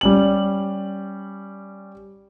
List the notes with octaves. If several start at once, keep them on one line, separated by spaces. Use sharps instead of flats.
G3 C#4 F#7